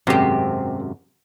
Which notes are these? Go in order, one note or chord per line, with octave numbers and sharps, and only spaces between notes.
G#1 F#2 C3 C4 G4